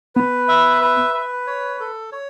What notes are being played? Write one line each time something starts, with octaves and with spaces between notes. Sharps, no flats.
B3 B4
E5
B4
B4
C#5
A4
C#5